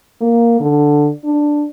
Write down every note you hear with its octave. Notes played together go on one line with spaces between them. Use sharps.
A#3
D3
D4